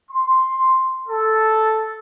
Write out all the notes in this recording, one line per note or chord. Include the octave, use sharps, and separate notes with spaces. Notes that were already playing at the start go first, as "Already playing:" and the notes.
C6
A4